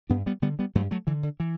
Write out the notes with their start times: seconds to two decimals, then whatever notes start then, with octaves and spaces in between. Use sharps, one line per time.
0.10 G2 B3 D4
0.26 G3 B3
0.42 D3 G3 B3
0.59 G3 B3
0.75 G2 F#3 A3
0.91 F#3 A3
1.07 D3 E3
1.23 D3
1.40 E3